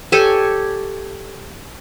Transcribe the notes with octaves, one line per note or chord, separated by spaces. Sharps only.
G4 A4 C#5 G#5